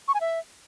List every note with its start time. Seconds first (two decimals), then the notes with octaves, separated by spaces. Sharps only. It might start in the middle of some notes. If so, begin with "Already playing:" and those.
0.08 C#6
0.14 G#5
0.21 E5